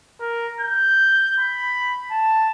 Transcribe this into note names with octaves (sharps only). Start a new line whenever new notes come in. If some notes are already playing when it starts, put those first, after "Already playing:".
A#4
G6
B5
A5